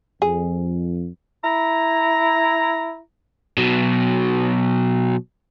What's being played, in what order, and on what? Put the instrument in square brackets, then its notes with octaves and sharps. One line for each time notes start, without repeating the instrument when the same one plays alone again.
[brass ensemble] F2 [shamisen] G#4
[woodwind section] E4 A#5
[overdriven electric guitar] B2 F#3